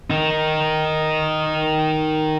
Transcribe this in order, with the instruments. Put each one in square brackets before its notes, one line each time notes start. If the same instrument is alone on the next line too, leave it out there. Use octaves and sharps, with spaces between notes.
[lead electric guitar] D#3 D#4